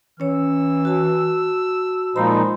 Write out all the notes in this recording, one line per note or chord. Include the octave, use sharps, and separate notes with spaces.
E3 C#4 C#5 E6
F#4 A5
A#2 F3 G#3 D#4 C5 B5